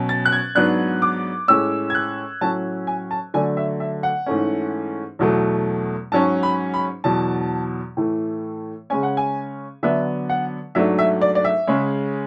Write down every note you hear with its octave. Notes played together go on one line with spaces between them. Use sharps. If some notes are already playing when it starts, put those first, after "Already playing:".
Already playing: B2 F#3 C#4
A6
F#6
G#6
G#2 F#3 B3 D4 F#6
D6
A2 G#3 C#4 E6
G#6
F#6
A2 F#3 C#4 A5
G#5
A5
D3 F#3 A3 D4 G#5
E5
E5
F#5
G#2 E3 A3 C#4
E2 B2 F#3 A3
G#2 F#3 C#4 A5
B5
B5
E2 B2 F#3 A5
A2 E3 A3
C#3 G#3 C#4 G#5
F#5
G#5
D3 F#3 B3 D4 E5
F#5
G#2 F#3 A3 D4 E5
E5
D5
D5
E5
C#3 G#3 C#4